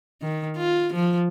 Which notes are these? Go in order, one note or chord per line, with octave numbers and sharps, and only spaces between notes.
D#3
F4
F3